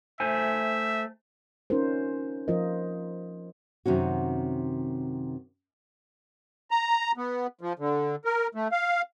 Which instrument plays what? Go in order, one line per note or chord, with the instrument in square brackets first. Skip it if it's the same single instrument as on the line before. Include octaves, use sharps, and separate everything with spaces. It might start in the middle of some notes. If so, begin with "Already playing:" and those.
[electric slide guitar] A3 C5 G#5 [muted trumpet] E5
[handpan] C#4 D#4 F4 A#4 C5
F3 F4 A#4 C5 D#5
[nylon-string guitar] F#2 C3 D#3 C#4 F#4
[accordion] A#5
B3
F3
D3
A#4
A3
F5